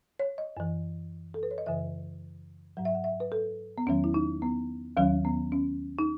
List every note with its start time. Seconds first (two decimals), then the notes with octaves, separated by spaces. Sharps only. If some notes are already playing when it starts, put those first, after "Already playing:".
0.19 C#5
0.38 D#5
0.57 F#2 E3
1.34 A4
1.43 B4
1.51 C#5
1.58 D#5
1.66 F#2 C#3 E3 E5
2.77 G#2 F#3 F#5
2.85 E5
2.95 F#5
3.04 E5
3.20 B4
3.32 A4
3.78 B3
3.87 E2 D#3 F#3 C#4
4.04 E4
4.14 D#4
4.42 B3
4.97 D#2 D#3 F#3 C#4
5.25 B3
5.52 C#4
5.99 D#4